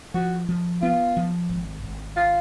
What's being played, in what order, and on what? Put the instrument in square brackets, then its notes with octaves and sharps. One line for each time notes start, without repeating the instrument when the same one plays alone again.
[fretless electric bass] F3 [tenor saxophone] F#4
[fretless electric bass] F3
[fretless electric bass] B3 [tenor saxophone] F4
[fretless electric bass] F3
G#1
G#1
[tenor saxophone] F4